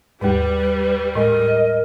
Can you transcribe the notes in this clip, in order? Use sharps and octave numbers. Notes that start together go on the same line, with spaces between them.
D#2 G#2 G3 B4
A2 G#3 A#4 D#5